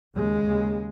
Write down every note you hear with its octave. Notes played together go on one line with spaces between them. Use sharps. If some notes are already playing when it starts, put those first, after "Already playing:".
D#2 C#3 G#3
D#2 C#3